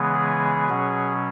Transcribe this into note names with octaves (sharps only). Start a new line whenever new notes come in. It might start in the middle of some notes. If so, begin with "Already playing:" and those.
Already playing: C#3 E3 G#3 B3
G#4
B2 F#3 C#4